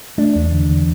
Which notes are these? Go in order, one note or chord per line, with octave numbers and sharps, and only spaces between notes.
A3 D4
E2
D3
E2